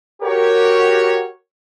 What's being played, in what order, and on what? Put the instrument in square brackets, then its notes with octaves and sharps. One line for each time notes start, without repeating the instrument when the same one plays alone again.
[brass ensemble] F#4 G4 A#4 C#5